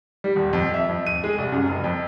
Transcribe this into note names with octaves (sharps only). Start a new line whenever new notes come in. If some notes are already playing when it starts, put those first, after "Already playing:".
G3
D#1
F2
E5
F2
D#7
G#3
C2
F#2
F#1
F2